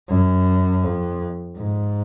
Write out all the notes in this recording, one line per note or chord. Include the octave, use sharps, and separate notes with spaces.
F#2
F2
G#2